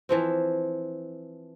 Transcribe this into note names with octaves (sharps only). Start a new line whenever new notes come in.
E3 F3 C4